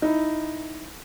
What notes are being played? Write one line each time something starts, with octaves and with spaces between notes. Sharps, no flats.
D#4 E4